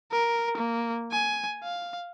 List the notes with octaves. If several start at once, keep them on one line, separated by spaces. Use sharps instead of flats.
A#4
A#3
G#5
F5